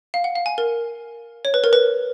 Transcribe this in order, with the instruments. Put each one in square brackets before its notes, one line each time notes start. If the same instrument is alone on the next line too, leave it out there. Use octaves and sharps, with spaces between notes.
[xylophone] F5
F#5
F5
G#5
A#4
C#5
B4
A#4
B4